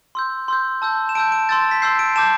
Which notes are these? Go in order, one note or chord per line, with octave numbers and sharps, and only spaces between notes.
C6 E6 G6
C6 E6 G6
A5 E6 G6
E7
A5 E6 G6 D7
D7
C6 E6 G6 A6
A6
B6
C6 E6 G6 C7
D7
A5 D6 G6 E7